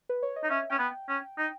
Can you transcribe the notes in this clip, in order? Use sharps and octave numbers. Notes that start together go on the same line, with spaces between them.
B4
C#5
D#5
D#4
C#4 E5
C#4 G5
B3
C#4
D#4